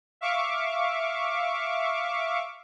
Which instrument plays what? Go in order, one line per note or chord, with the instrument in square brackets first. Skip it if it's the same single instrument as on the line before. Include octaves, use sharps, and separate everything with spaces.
[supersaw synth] E5 F5 C#6 D6